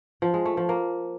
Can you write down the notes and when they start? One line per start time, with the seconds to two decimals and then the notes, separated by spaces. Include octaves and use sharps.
0.22 F3
0.34 G#3
0.45 A3
0.57 F3
0.69 A#3